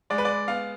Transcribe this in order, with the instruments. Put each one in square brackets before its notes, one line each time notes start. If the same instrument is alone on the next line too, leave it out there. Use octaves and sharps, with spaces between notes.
[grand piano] G#3 D5
B4
D5
B3 F5